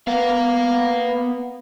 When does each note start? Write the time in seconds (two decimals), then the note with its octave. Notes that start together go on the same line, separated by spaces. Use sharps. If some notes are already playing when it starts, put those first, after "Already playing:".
0.07 B3 A#4 F5